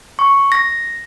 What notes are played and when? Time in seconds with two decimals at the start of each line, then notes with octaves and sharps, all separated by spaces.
0.19 C#6
0.52 A#6